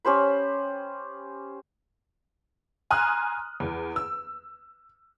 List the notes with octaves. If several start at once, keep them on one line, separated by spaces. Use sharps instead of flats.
C#4 G4 C5 B5
G#5 A#5 C6 D#6 F6 F#6
E2
E6